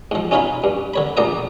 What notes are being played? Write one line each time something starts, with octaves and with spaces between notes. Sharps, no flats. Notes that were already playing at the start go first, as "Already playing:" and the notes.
G#2 F3
C#4 D#4 F4 C#5 F5 B5
G2
D3 C#5 B5
A#1 F3 A3 D5 A#5 D#6